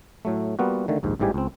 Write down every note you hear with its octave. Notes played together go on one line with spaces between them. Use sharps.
A2 F#3 A3
G3 A#3 B3 F4 F#4
D3 D#3 A3
A#1 D#2 G#2
A1 G#2 E3 G3 G4 G#5
C#2 C4